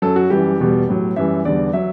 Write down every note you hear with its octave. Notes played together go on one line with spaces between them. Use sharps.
F#2 F#3 A4
F#4
F#2 E3 G3 G4
E2 B2 G3
A2 F#3
F#2 E3 G3 E5
E2 D3 G3 D5
F#3 E5